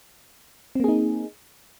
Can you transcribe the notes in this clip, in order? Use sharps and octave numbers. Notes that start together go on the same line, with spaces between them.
A#3 C4 D#4 G#4